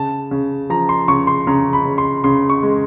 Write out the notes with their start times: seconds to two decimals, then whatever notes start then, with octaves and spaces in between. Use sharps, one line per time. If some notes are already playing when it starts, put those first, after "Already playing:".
Already playing: C#3 A5
0.31 C#3
0.70 F3 A#5
0.89 C6
1.08 C#3 C#6
1.27 C6
1.47 C#3 A#5
1.73 B5
1.85 C#3
1.98 C6
2.24 C#3 C6
2.49 C#6
2.63 G#3